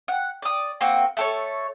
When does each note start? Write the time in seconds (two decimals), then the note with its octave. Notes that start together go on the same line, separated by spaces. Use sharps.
0.08 F#5
0.42 D5 D#6
0.81 A#3 C4 F#4
1.17 A3 A4 C#5